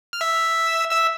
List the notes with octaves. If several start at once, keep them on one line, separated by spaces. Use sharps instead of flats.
F6
E5 E6
E5 E6